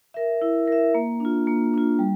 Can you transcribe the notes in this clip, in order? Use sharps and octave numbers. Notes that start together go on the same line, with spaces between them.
A#4 E5
E4
A#4 E5
A#3
D4 F4
A#3
D4 F4
G3